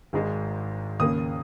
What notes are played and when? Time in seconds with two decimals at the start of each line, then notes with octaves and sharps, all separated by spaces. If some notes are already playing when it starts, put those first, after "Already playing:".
0.13 G#1 G#2 G#3
1.00 D#2 C#3 A#3 D#6